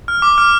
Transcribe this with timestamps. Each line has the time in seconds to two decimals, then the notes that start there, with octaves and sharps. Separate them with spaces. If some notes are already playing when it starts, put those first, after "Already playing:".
0.08 F6
0.22 D6
0.38 F6